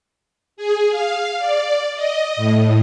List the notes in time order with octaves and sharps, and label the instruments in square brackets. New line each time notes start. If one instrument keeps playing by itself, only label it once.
[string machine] G#4
F5
D5
D#5
A2